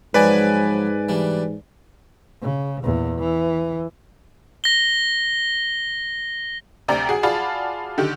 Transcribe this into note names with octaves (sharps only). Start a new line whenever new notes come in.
G#2 F3 F#3 G#3 B4 D5 G#5
E3 G3 D4
C#3
E2 A#2
E3
A#6 G7
D2 C3 D5 G5 A#5
F#4 G#4
F4 F#4 G#4 D5 A5 B5
D3 D#3 G4